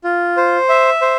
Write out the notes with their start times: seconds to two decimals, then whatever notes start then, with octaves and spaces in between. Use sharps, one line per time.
0.04 F4
0.37 C5
0.69 E5
1.02 C5